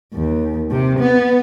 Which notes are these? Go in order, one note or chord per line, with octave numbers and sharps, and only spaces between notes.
D#2
C3
B3